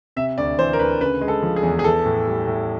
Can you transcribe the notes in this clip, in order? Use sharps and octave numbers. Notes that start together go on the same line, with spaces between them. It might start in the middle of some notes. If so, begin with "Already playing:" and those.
C3 E5
D2 D5
E3 C5
A#4
D2 B4
C#3 B4
G#3
A4
F3
G#4
E2
G#4
E3 A4
A2
G3
A2